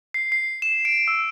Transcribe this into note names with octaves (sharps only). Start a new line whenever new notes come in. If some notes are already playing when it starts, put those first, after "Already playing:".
C7
C7
E7
D7
E6